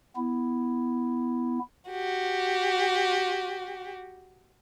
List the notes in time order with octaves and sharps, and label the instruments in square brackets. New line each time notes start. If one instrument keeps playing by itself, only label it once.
[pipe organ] B3 E4
[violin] F#4 G4